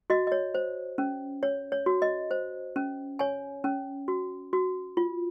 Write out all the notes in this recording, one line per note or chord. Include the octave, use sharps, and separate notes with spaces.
F#4 D#5
D#5
C#5
C5
C#4
C#5
C#5
F#4
D#5
C5
C#4
C#5 G#5
C#4
F#4
F#4
F4